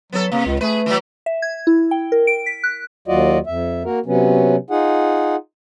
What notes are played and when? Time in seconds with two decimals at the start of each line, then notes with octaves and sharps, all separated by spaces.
0.13 F#3 B3 A4
0.32 C3 A#3
0.46 C#2
0.61 A3 G#4 B4
0.86 E3 F#3
1.26 E5
1.42 G#6
1.67 E4
1.91 G5
2.12 A#4
2.27 D7
2.46 B6
2.64 F#6
3.08 D#2 F#3 F4 F#4 D5 D#5
3.47 F2 E5
3.85 A#3 F#4 A#4
4.06 C3 F#3 B3 C#4
4.70 D#4 F4 G#4 F#5